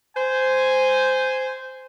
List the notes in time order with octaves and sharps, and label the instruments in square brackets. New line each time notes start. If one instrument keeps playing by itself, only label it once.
[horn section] C5 G#5